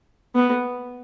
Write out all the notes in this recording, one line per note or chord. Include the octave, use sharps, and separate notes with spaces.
B3